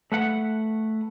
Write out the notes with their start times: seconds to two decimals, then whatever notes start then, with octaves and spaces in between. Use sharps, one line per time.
0.12 A3 B4 F#5